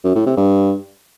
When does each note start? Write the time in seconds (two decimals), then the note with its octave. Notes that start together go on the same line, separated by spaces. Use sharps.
0.05 F#2
0.15 A2
0.26 C3
0.37 G2